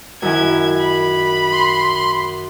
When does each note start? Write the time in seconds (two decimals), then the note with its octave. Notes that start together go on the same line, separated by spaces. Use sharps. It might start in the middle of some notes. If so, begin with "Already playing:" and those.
0.22 F#2 D#3 E4 G#5 G#6
0.81 B5
1.53 C6